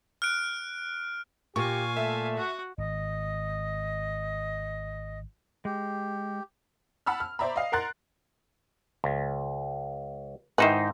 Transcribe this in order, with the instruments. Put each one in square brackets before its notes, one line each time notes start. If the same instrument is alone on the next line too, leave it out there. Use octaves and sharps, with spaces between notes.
[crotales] F6 F#6 D7
[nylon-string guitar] A#2 [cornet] G4 [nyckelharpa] F5 G#5 [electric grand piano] C#6
[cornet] A3 [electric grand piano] E5
[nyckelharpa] F#4 F#5
[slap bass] G#1 [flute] D#5
[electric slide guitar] G#3 [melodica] G4
[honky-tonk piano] F#5 A5 B5 E6 F6
F6
C5 D5 E5 A#5 B5
D#5 F5 C7
A#4 F#5 A#5 C6 F#6 A6
[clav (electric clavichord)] C#2
[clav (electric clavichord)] G#2 D#4 C5 [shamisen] D#3 E4 B4